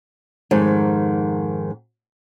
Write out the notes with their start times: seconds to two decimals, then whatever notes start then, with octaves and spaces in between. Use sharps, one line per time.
0.51 F2 G#2 D#3